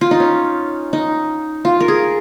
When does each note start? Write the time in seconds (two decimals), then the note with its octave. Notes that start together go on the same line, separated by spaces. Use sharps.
0.01 F4
0.11 D#4
0.20 C#4
0.93 D#4
1.65 F4
1.80 A#4
1.88 G#4